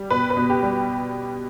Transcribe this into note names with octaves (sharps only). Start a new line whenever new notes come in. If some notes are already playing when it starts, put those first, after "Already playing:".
Already playing: G3
B2 B4
B4
B2
G4
G3